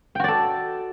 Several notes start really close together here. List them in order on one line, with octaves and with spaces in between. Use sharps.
G5 F#4 D5 A4